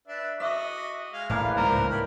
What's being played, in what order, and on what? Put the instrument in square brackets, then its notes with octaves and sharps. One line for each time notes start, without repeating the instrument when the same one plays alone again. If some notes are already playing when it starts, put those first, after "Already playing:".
[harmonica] D4 B4 E5
[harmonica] F#4 D#5 D6 [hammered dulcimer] E5
[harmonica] G#3 F5
[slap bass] A2 [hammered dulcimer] E3 A#3 D4 [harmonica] G#4 F5
[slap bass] C#2 G#2 A3 [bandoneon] A#4 [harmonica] C5 A#5
[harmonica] C#5 G5 B5